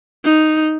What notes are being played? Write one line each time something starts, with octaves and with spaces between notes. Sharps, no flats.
D#4